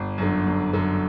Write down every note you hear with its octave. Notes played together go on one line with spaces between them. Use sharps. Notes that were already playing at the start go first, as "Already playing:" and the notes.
Already playing: G1
F#2 D3
G1
F#2 D3